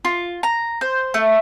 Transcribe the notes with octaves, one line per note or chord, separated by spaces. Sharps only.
F4
A#5
C5
A3